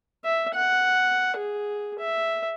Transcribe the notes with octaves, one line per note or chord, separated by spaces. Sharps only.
E5
F#5
G#4
E5